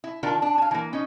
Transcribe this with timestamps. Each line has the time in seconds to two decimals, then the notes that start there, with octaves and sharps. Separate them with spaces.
0.04 E4
0.23 D#3 D4 F4 A#4
0.42 D4
0.58 F5 G#5
0.71 E3 A#3
0.93 C#4 D#4